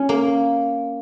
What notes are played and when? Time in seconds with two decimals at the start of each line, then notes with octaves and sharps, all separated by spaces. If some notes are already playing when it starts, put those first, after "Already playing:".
Already playing: C#4
0.09 A#3